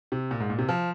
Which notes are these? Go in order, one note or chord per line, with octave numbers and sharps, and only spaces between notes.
C3
A#2
G#2
A#2
C3
F3